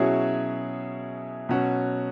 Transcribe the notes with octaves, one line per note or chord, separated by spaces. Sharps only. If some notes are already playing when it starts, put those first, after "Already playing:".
Already playing: B2 F#3 C#4 E4 G#4
B2 F#3 C#4 F#4